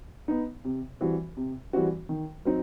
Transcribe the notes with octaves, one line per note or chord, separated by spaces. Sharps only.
B3 D#4
C3
E3 G3 C4 F#4
C3
E3 G3 C4 F#4
D#3
F#3 C4 D#4